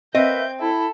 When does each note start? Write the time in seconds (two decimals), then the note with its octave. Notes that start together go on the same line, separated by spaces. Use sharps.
0.15 A#3 C4 B4 D#5 E5 G6
0.60 E4 A4